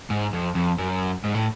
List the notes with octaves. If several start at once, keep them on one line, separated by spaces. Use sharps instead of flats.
G#2
F2
F2
F#2
G#2
A2